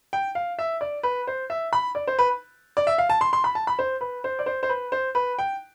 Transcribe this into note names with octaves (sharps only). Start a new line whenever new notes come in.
G5
F5
E5
D5
B4
C5
E5
B5
D5
C5
B4
D5
E5
F5
A5
C6
C6
B5
A5
B5
C5
B4
C5
D5
C5
C5
B4
C5
B4
G5